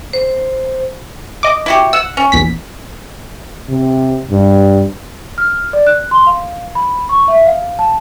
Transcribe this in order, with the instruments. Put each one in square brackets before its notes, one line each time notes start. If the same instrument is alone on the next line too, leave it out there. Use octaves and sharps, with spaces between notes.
[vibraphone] C5
[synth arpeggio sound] D#5 D6
[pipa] E4 F#4 G4
[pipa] F#5 [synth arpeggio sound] E6
[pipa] C#4
[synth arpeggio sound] A#1 E2 B6
[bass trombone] C3
G2
[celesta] F6
D5
F#6
C6
F5
B5
C#6
E5
F5
A5